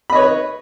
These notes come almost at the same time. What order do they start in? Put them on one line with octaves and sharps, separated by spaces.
B5 D#5 C#5 B4